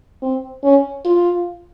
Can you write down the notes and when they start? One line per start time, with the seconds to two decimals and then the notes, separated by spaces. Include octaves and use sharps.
0.23 C4
0.63 C#4
1.05 F4